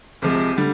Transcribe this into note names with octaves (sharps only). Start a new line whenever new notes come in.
C2 C3 F3 G#3
D3 G3